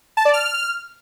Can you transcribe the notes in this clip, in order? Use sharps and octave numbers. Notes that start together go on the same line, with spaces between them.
A5
D5
F6